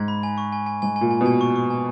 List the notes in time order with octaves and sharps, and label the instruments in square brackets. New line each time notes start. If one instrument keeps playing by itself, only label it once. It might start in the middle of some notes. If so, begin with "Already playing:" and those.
Already playing: [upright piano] G#2 [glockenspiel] G#6
[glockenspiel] B5
G#5
C#6
G#5
G#5
[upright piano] G#2 [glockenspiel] G#5
[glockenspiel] G#5
[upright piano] A#2
[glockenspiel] G#5
[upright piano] B2
[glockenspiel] G#5
C#6
C#6
G#5